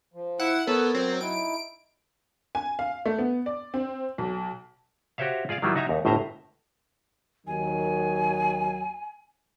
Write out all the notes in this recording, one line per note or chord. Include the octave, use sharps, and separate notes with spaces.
F3
E4 F#5
B3 A4 A#4 C#5
F#3 C4
D#4 E4 D7
G#5
F5
A3
B3
D5
C4
B1
F#4 G4 C5 C#5 E5 F5
F4 G#4 D5 F5
D#3 F#3 G3 E4 F4
D#4 F#4 E5 G#5 A#5
D#2
G1 A2 C5 E5 A#5
D#2 D#3 F#3 G#5